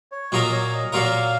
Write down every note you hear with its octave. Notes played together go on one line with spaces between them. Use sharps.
C#5
A#2 F#3 A#3 F4 A#4 D#5
C#5
D#5
A#2 F#3 A#3 F4 A#4 F5